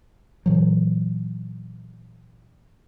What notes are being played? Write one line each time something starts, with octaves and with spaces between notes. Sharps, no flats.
A#2 E3 F#3